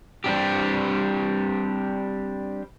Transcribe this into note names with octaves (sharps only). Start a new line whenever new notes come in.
G3 C4 D4 G4